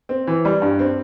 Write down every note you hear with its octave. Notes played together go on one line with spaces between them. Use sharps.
C4
E3
G3
G2
C4